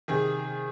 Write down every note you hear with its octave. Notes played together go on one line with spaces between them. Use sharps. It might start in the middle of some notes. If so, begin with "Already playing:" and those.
C3 D#3 G#4